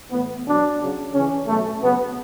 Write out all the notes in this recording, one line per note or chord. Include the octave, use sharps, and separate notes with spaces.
A2 E3 B3
B2 F#3 D4
C#3 F#3
C#3 E3 C#4
B2 F#3 A3
C#3 F#3 B3